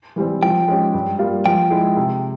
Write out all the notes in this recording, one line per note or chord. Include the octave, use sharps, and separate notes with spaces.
E3 G3 C4
F3 G5
G#3 C#4 G4
G2
G3 A#3 F4
F3 G5
G#3 E4 G#4
C3